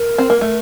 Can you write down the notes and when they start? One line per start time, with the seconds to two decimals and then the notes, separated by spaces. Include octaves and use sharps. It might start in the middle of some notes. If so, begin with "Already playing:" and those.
Already playing: A#4
0.18 C4
0.30 A#3
0.41 A3